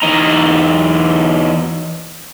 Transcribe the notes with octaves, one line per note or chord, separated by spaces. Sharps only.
E2 D#4 A#5